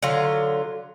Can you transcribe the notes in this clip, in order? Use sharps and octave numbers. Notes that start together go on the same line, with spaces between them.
D3 F#3 F4